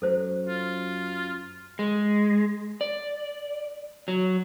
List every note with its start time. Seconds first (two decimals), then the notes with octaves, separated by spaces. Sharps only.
0.02 F#2 F#3 A4 C5
0.47 F4
1.79 G#3
2.81 D5
4.08 F#3